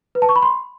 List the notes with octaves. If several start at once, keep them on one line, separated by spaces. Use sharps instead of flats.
B4
A5
C#6
B5
C6